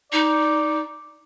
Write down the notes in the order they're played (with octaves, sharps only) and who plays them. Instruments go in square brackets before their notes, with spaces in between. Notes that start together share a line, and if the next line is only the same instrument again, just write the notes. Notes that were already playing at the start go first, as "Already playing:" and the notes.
[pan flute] D#4 [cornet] D5